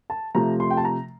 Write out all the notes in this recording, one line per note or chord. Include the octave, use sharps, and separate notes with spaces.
A5
C3 F3 A3 A#5
C6
G5
A5
A#5